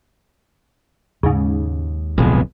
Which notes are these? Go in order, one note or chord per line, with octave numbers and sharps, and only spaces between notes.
D#2 G#2 C#3
D1 B1 F2 B2 G#3